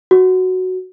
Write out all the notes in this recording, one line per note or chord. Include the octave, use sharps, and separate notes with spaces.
F#4